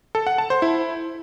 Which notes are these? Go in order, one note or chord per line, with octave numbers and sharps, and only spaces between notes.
A4
F#5
A5
C5
E4